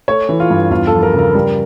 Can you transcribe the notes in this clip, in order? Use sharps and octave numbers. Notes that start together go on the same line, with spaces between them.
A3 C#5
E3
F4
G2
E2 F4
A4
F3
A#4
C#3 A#4
G3